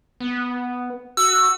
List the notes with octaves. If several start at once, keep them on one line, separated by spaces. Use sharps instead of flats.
B3
F#4 E6